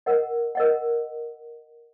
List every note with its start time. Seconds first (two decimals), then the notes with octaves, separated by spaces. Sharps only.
0.06 A#4 D#5 F#5
0.55 A#4 D#5 F#5